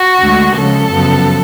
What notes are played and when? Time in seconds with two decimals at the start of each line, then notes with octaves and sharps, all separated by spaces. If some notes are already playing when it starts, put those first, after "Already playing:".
Already playing: F#4
0.19 D2 D3 G#3
0.54 C#3 F3 G#3 C#4 A4
0.90 F#2 C#3 F3 B3